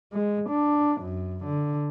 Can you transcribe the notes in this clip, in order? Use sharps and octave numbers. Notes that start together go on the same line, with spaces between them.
G#3
D4
F#2
D3